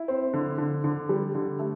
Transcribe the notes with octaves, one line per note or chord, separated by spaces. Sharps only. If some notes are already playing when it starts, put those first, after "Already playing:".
Already playing: E4
C4
D3
D3
D3
G3
D3
A3